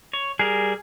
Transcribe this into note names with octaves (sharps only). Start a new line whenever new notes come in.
C#5
G3 G#4 A#4